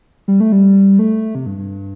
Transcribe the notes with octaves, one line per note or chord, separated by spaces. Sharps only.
G3
A3
G3
A3
C3
G2
G2